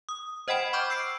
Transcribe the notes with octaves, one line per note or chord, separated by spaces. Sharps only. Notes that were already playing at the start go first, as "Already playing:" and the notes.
D#6
C5 D#5 F#5 G5 B5 D7
B5 C#6 D6 F6 G6
E6 C7 D7